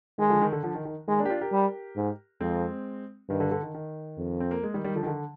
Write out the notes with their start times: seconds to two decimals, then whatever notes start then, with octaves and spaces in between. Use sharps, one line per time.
0.18 D#3 G#3
0.30 D3 F3
0.42 D#3
0.52 D3
0.63 D3 F3
0.75 D#3
0.85 D#3
1.08 D#3 G#3
1.19 A#3 D4
1.25 G4
1.30 D4 F4
1.41 G4 A#4
1.52 G3
1.96 G#2
2.40 F2 G#3 C4
3.29 G2 D#3
3.40 D3
3.52 D3
3.63 D#3
3.74 D#3
4.18 F2
4.40 C4
4.51 A#3
4.63 G#3
4.74 D#3 G3
4.84 D#3 G3
4.96 D3 F3
5.03 D#3
5.07 D3